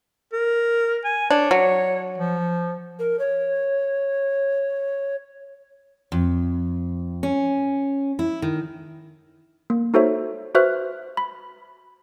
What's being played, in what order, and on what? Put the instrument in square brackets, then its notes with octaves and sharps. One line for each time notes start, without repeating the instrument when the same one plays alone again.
[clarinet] A#4
G#5
[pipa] D4 [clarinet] C#5
[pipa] F#3
[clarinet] F3
[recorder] A#4
C#5
[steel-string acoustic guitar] F2
C#4
E4
D#3
[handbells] A#3
D#4 F#4 A4 C5 C#5 E5
F#4 B4 C5 E5 F6 F#6
B5